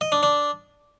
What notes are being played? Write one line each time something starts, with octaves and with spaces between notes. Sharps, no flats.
D#5
D4
D4